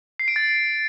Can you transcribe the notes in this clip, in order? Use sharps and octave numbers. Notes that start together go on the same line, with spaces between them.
C7
D7
A6